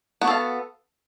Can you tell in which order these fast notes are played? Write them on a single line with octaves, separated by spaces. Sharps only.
B3 F#4 A4 F5